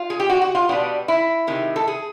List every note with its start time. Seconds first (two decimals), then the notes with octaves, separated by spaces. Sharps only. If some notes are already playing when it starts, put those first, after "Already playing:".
Already playing: F4
0.10 G#4
0.20 G4
0.30 F#4
0.42 F#4
0.55 F4
0.69 B2 G3 B3 D4
1.08 E4
1.47 C3 D#3 G#3
1.76 A4
1.88 G#4